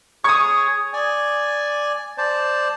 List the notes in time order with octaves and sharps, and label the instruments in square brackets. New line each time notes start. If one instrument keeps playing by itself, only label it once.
[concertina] G#4 C#5 [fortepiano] C#6 D#6
[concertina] D5 G#5
C5 D5 A5